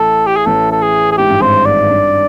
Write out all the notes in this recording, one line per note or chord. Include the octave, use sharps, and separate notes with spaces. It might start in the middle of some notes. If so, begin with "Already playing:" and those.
Already playing: A1 A2 A4
G4
G#4
A1 A2 A4
A4
G#4
G#4
G#2 G4
G2
G#1 G#2 C5
D5
G2